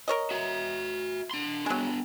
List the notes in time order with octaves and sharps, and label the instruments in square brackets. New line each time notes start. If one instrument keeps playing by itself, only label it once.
[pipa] A#4 C#5 D#5
[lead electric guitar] F#4 E5
D4 C6
[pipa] F#3 G#3 [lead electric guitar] B3 D4